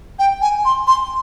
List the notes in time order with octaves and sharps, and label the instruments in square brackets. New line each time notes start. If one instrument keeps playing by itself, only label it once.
[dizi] G5
G#5
C6
C6